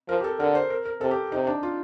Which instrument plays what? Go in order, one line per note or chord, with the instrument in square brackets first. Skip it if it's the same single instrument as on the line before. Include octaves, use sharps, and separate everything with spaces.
[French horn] F3 [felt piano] A#4
[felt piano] G4
A4
[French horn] D3 [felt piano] A#4
[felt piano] C5
A#4
A#4
[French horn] C3 [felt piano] A4
[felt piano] G4
[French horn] C3 [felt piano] D#4
[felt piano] D4
F4